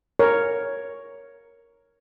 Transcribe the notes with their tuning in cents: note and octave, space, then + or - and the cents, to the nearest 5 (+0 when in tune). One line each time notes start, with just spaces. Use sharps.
A#4 +0 C#5 +0